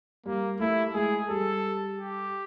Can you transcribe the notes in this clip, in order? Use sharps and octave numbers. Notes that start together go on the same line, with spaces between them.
G3 A#3
A3 E4
G#3 G#4
G3 A4
G4